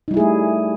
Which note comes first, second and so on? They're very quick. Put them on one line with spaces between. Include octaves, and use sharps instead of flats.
D#4 G3 E4 G#4 A3